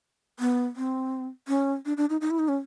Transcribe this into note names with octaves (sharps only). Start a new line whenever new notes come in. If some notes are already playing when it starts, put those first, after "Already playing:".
B3
C4
C#4
D4
D4
D#4
D#4
E4
D#4
C#4